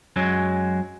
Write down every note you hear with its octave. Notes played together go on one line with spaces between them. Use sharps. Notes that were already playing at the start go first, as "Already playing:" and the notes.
F#2 F#3 G#3